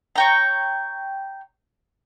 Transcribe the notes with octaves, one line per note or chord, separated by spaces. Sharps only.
C#5 G5 A#5